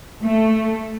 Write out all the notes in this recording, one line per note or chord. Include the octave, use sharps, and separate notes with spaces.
A3